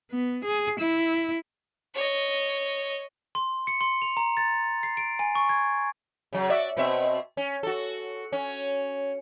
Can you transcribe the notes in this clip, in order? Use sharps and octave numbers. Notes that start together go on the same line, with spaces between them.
B3
G#4
E4
C#5 D#5
C6
C#7
C6
F7
A#5
A6
C7
D7
G#5
C#6
G#6
C#3 F#3
F#4 D5 E5
B2 C4 E5
C#4
F#4 A4
C#4